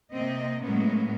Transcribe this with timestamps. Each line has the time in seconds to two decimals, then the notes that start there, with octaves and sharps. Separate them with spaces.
0.11 C3 A#3 C4 D#5
0.62 A2 F#3 G#3 A#3 B3 C#4